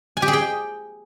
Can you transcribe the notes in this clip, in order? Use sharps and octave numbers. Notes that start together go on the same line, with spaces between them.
G#5
G4
G#4
G5